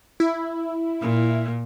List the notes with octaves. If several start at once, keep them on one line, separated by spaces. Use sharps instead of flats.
E4
A#2